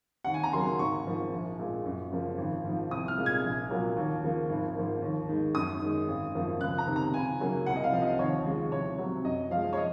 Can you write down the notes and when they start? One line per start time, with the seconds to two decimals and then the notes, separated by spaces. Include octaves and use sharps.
0.24 D#2 F#5
0.34 G#5
0.43 A#5
0.53 C#3 F#3 A#3 C6
0.79 G#1 C#6
1.06 G#2 F3 A#3
1.32 A#1
1.59 A#2 G#3
1.85 F#2
2.12 C#3 F3 A#3
2.38 G#1
2.65 G#2 F3
2.91 C2 D#6
3.08 F6
3.17 A#2 G#3
3.26 G#6
3.44 A#1
3.70 A#2 F#3 A#3
3.97 D#2
4.23 C#3 F3 A#3
4.49 G#1
4.76 G#2 F3 A#3
5.02 D#2
5.29 D#3 G#3
5.55 F#2 D#6
5.81 D#3 G#3
6.08 G#1
6.34 F#2 F3 A#3
6.61 C#2 F#6
6.78 A#5
6.87 C3 D#3
6.96 A#5
7.14 C#2 G#5
7.40 C#3 F#3 A#3
7.66 C2 F#5
7.76 D#5
7.84 F5
7.92 C3 F3
8.02 D#5
8.19 D#2 C#5
8.45 C#3 F3 G#3
8.72 C2 C#5
8.98 C3 F#3
9.25 F#2 D#5
9.51 F3 G#3 F5
9.73 C#5
9.77 D#5